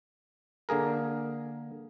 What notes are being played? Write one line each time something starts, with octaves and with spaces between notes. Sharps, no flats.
D3 A#3 G#4 A#4